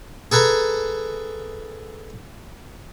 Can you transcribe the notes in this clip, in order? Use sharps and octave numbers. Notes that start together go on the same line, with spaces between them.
G#4 A4 B4 G#5 A#5